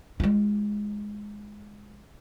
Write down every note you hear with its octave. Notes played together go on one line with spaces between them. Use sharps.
G#3 F4